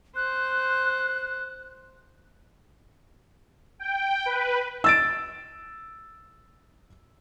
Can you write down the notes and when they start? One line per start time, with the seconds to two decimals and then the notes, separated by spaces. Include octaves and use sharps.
0.16 C5 F#6
3.79 G5
4.26 B4
4.84 E6 A6 D7